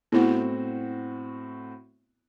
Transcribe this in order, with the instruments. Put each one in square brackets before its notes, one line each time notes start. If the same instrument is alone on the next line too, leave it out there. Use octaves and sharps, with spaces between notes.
[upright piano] A2 C4 F#4 [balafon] B3 E4